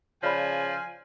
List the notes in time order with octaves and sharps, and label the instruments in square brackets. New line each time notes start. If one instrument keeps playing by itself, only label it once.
[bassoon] C#3 [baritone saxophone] F3 [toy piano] C#5 D5 B5 [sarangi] G#5